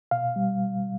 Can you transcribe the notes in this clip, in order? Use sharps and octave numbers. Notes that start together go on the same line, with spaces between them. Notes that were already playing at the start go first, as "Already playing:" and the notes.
B2 F5
G3